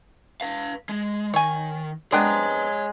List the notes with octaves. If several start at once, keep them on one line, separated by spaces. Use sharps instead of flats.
B4 F5
G#3
D#3 C#5 G#5
G#3 B3 C4 D4 C#5 A#5